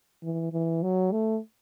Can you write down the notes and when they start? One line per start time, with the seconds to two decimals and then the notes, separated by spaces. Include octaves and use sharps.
0.23 E3
0.53 E3
0.83 F#3
1.12 A3